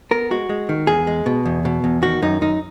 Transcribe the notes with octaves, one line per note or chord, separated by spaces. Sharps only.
B3 A#4
G#3 F#4
G#3
D#3
E2 G#4
G#3
B2
E2
B2
E2
D#3 F#4
F#2 D#4
F#2 D#4